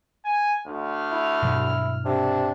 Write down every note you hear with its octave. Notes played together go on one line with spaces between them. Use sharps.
G#5
D2 F6
E4
G2 B2 F#3
C3 D4